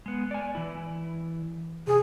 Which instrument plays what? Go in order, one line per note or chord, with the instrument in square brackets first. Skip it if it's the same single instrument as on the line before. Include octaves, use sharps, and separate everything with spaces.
[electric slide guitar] G#3 B3
D5 G#5
E3 E4
[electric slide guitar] C3 [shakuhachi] G#4